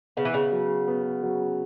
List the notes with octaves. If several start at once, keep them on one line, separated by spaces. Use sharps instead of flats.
C#3 B3
E3
C#3
F#3
B3
F#3